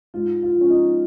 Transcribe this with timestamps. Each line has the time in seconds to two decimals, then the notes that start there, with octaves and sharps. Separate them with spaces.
0.14 G#2 F4
0.43 F4
0.57 F3 C#4
0.70 D#4